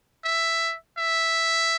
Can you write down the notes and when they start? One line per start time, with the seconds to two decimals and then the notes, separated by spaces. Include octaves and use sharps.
0.24 E5
0.98 E5